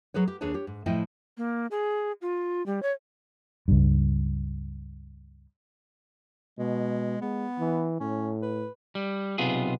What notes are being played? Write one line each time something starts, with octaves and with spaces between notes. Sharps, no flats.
F#3 G#4 B4 C#5
G4
D#2 D4 G#4 B4 C#5 A5
G4 C#5
G#2
A2 F3 E4 D#5 G5 G#5
A#3
G#4
F4
G3
C#5
C#2 G2
B2 G#3
G#3 B3
E3
A2 C#4
B4
G3
B1 C3 B3 F4 G#4